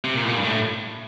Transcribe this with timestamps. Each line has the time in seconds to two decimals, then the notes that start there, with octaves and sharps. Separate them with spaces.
0.04 C3
0.15 A#2
0.24 A2
0.28 A#2
0.38 G2
0.44 A2